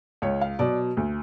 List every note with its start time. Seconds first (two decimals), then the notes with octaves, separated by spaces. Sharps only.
0.22 C#2 C#5
0.41 F5
0.59 B2 F#3 D5
0.97 D2